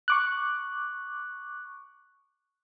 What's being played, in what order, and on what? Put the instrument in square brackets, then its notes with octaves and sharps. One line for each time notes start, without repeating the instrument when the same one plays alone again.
[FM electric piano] C#6 D6 F#6